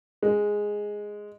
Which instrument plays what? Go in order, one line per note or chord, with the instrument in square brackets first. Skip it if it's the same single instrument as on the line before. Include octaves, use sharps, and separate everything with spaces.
[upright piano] G#3